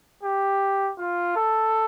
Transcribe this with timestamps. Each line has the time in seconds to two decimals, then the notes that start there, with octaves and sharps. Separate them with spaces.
0.23 G4
0.98 F4
1.36 A4